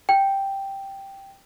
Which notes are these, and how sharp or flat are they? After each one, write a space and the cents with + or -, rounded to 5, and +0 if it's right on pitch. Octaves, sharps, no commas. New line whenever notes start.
G5 +0